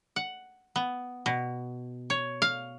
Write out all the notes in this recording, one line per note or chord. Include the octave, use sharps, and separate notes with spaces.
F#5
B3
B2
C#5
F5